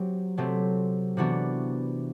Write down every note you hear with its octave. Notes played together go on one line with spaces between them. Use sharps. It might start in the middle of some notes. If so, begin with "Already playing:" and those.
Already playing: F#3 C4 G4
C3 F#3 A3 C4
C3 E3 B3 D4 F#4